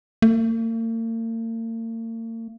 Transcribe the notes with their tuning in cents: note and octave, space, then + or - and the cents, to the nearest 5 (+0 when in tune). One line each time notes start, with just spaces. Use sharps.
A#3 -45